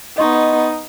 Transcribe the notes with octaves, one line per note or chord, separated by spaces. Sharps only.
B3 D#4 D#5 C6 C#6